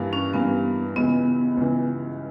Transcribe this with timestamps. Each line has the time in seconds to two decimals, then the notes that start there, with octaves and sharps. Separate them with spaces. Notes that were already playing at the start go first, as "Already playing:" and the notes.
Already playing: G2 E3 G3 A#3
0.13 C#4
0.34 G2 E3 G3 A#3 B3
0.96 C#2 C#3 E3 B3
1.57 C#2 C#3 E3